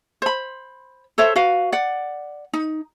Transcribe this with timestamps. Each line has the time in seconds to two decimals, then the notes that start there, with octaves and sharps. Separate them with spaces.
0.22 C5 B5
1.18 A4 C5 C#5 E5
1.36 F#4 B4 F5
1.72 D5 F#5
2.53 D#4